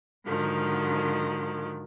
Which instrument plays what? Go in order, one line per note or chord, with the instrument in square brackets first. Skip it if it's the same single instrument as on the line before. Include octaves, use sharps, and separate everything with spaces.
[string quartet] G#2 D3 D#3 F3 F#3